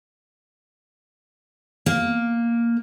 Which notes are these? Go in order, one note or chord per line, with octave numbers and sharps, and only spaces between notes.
A#3